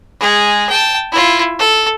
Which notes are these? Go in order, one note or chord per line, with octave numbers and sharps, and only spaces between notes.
G#3 G#4
G5 A5
E4 F4
A4